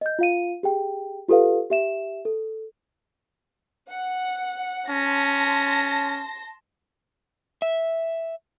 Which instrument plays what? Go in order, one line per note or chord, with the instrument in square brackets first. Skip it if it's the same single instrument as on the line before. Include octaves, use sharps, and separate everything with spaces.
[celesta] D#5 G6
F4 F5 D#7
G4 G#4 G5
F4 G4 A4 B4 F5
G4 E5 E7
A4
[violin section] F#5
[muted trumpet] C#4 [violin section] A5 C6 A#6
[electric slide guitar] E5